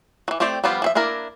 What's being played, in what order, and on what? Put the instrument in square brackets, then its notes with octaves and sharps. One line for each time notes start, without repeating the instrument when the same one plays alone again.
[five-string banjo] E3 F#3
A3 C4 G4 C5 D5
F3 G3 B3 F4 G4
F3 G#4 E5
A#3 D4 E4 A#4